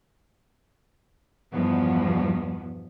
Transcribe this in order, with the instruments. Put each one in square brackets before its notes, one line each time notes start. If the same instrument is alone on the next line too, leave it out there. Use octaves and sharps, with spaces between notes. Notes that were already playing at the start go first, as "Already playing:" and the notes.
[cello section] E2 G2 B2 F3 B3